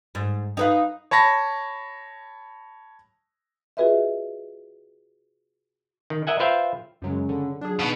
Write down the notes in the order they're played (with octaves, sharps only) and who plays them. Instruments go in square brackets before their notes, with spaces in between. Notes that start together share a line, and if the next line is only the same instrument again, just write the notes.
[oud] G#2
D#4 B4 F5
[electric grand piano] C#5 A5 B5 A#6
[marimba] F4 F#4 G#4 B4 D#5 E5
[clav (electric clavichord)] D#3
A#4 D#5 E5 F#5 G#5
F4 B4 C5 E5 F5 G5
[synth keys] F#2 F#3 G#3 [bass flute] C#3
[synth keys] D3
[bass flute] F#3 [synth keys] D4 G#4
[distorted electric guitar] B2 B3 [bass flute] D#4